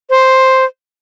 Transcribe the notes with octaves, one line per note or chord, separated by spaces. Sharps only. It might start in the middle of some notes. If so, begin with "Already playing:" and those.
C5